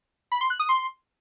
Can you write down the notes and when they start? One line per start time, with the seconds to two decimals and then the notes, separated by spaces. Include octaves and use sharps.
0.32 B5
0.41 C6
0.50 F#6
0.59 D#6
0.69 C6